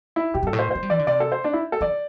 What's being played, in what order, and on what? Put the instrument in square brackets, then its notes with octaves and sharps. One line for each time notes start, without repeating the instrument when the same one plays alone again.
[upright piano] E4
[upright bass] A2 [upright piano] G4
[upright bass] G2 [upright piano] A4
[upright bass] A2
[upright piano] C5
[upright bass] A3 [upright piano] C5
[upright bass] G3
[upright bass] E3 [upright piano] D5
[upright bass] D3
[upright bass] C3 [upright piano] D5
[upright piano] A4
C5
D4
E4
A4
[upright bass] E3 [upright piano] D5